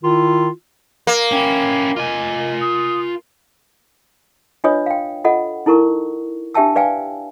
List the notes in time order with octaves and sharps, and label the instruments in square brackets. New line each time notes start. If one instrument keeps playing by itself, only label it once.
[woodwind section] D#3 E4 F4
[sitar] A#3
[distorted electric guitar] C#4 E4 [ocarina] G5
[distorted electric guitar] F4 G#5 [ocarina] D#5
[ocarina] D#6
[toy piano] D4 F4 B4 C#5 D#5 D#6
F5 G5
F4 A4 D#5 F#5
D#4 E4 A4 A#4 C#6
D4 G4 E5 G5 A5 E6
B4 D5 F5 G5 G#5